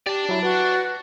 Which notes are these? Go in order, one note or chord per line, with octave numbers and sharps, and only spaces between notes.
G4 D5 A5
F#3 E4
F#4 B4